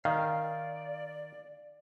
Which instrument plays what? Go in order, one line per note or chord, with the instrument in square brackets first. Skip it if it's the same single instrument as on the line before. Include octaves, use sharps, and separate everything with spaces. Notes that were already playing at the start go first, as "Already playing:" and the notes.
[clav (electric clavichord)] D#3 [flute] D5 [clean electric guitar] F5